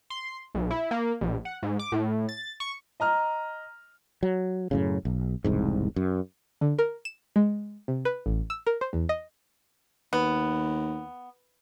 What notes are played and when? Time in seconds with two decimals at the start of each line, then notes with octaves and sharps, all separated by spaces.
0.10 C6
0.55 B1
0.71 E4
0.91 A#3
1.21 A#1
1.45 F#5
1.63 G#2
1.79 D6
1.92 A2
2.29 A6
2.60 C#6
3.00 D#5 A#5 F6
4.23 F#3
4.71 F#2 A2 C#3
5.05 B1
5.44 E1 C2 G#2
5.96 F#2
6.61 D3
6.79 A#4
7.05 E7
7.36 G#3
7.88 C3
8.05 B4
8.26 A1
8.50 E6
8.66 A#4
8.81 C5
8.93 E2
9.09 D#5
10.13 D#2 B3